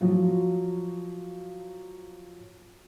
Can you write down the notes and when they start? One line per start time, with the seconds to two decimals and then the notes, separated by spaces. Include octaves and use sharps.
0.01 F3 F#3 F4